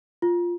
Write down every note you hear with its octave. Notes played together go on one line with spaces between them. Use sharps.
F4